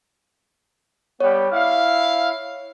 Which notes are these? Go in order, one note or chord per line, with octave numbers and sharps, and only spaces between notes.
G3 B3 C#5
E4 F5